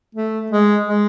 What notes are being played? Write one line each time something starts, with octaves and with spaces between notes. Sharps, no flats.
A3
G#3
G#3